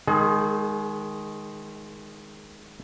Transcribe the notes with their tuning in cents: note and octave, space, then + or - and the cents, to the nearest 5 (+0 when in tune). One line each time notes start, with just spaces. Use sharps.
D#3 +0 G#3 +0 G#4 +40